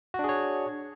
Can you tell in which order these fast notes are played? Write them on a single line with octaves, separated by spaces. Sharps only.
F#4 D4 G#4 C#5